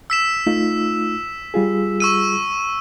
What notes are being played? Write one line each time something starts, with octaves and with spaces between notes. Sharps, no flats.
E6 B6 E7
A3 D#4 F4
G3 F4 G#4
C#6 E6 D#7